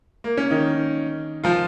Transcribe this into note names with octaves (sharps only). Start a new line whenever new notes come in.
A#3
C#4
D#3 D#4
F3 F4